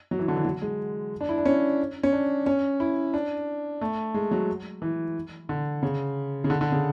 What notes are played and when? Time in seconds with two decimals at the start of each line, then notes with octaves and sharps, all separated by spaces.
0.11 F#3
0.19 E3
0.28 D3
0.36 E3
0.45 F#3
0.62 G#3
1.21 D4
1.29 E4
1.38 D4
1.46 C#4
2.03 C#4
2.13 D4
2.46 C#4
2.80 E4
3.14 D4
3.81 A3
4.14 G#3
4.31 F#3
4.82 E3
5.49 D3
5.83 C#3
6.44 C#3
6.50 D3
6.61 D3
6.72 C#3